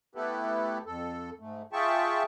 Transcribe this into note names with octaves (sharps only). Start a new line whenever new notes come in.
A3 B3 E4 G4 A4 B4
F2 A4
G#2 A3
F4 G#4 E5 G5 A5 C#6